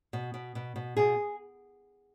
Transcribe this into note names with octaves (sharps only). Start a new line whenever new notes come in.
B2
B2
B2
B2
B2 G#4